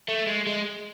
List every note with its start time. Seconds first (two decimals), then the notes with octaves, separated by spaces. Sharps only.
0.08 A3
0.27 G#3
0.47 G#3